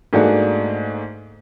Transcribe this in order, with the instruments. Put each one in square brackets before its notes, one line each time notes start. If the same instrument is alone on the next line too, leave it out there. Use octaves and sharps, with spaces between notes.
[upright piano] G#2 A3 A#3 D4 F#4 G#4